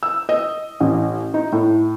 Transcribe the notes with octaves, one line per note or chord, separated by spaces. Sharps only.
E6
D#5
A1
D#4
A2